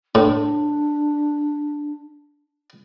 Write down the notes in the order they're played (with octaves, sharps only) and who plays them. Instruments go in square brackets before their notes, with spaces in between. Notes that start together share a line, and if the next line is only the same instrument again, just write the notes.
[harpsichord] A2 [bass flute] D4